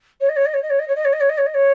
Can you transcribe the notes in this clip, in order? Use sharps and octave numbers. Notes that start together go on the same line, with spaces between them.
C#5
D#5
C#5
D#5
C#5
D#5
C#5
D#5
C#5
D#5
C#5
D#5
C#5
D#5
C#5
D#5
C#5